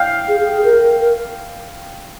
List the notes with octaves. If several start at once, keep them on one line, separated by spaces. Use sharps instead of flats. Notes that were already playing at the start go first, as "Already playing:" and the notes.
Already playing: F5 G5
G#4
G#4
G#4
A#4
A#4